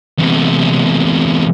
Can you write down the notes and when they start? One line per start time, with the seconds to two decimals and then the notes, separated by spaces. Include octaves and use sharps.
0.18 E2 C3